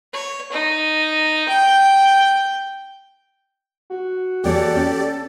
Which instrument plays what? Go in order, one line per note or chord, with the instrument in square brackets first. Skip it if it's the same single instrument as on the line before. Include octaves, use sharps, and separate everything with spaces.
[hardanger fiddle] C#5
D#4
G5
[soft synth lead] F#4
[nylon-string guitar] E2 A#3 C#5 [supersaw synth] G4 D5 [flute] A4
[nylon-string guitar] C#4